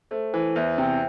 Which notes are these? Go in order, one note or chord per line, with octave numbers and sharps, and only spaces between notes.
A3 C5
E3 C5
E2 E5
C3 G5